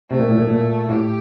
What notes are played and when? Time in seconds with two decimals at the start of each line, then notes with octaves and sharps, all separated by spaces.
0.11 C3 A3
0.19 A#2
0.28 A2
0.38 A#2
0.50 A#2
0.89 A2 G4